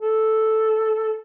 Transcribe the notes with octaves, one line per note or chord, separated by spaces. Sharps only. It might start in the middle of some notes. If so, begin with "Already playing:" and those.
A4